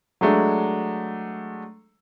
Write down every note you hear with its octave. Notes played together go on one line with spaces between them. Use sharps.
F#3 G#3 A3 D4